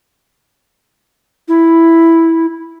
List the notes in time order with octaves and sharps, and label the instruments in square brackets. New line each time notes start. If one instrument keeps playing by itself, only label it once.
[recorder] E4